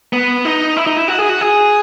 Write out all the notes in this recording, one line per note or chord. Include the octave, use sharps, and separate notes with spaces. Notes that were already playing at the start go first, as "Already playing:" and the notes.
B3
D#4
E4
D#4
E4
F#4
G#4
F#4
G#4